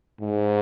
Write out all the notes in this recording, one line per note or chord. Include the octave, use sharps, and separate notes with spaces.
G#2